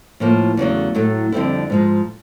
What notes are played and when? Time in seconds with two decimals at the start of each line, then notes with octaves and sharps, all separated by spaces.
0.20 A2 F3 A#3
0.57 E2 C#3 F#3 A3
0.95 A2 F#3 A3
1.32 F2 D3 G3 C4 E4
1.70 G#2 F3 G#3